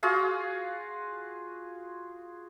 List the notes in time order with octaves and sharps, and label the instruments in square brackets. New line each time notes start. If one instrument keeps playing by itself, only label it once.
[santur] F4 F#4 G#4 F5